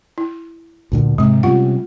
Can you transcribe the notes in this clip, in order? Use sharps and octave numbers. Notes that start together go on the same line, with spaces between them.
E4
D2 A#2 D3
G#2 C3 G#3
C3 G3 C#4 F4 F#5